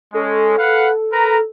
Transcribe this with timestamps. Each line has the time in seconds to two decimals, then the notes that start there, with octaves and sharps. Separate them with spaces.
0.14 G#3 C#4 A4
0.58 B4 F5 F#5
1.13 A#4 B4 A#5